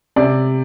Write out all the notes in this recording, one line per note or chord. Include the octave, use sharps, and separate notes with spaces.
C3 D5